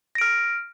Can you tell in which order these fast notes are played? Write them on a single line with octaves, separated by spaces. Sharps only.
A#6 D7 F6